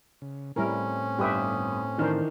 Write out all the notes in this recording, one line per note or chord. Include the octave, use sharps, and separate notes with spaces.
C#3
A2 G3 C4 C#4 E4 A#4
G1 G4 B4 E5 D#6
D#3 E3 D4 A#4 C5